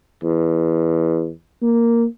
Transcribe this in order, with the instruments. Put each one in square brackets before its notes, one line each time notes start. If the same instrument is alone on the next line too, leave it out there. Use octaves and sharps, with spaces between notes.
[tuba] E2
A#3